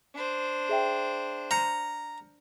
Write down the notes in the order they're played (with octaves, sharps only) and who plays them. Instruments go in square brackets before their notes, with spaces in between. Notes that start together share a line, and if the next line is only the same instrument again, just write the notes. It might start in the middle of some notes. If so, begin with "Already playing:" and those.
[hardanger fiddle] D4 C5
[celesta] G#4 E5 G5
[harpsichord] A#5 [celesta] F6 G6 C#7